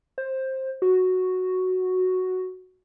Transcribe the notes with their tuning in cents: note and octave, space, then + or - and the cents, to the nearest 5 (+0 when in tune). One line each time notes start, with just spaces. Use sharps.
C5 +15
F#4 +0